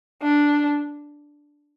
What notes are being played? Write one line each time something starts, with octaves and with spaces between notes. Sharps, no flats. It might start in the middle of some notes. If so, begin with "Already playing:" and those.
D4